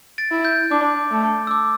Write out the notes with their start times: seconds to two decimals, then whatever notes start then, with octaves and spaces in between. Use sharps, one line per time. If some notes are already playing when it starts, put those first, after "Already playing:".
0.18 A6 D7
0.31 E4
0.45 G6
0.71 D4 D6
1.11 A3
1.47 E6
1.51 D6